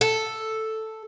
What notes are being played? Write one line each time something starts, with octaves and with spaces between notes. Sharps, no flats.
A4